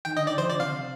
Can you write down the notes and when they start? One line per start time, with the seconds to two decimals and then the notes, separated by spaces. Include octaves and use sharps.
0.05 D#3 G5
0.16 D3 D#5
0.27 D#3 D5
0.37 F3 C5
0.49 D3 D5
0.60 C3 F5